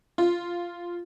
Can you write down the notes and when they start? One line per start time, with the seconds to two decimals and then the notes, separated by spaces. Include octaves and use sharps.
0.18 F4